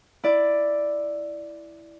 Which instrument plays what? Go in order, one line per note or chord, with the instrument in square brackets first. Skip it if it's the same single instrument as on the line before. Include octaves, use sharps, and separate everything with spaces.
[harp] E4 D5